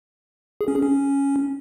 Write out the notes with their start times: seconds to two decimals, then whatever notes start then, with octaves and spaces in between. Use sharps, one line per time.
0.61 G#4
0.68 C#4
0.75 G#4
0.82 C#4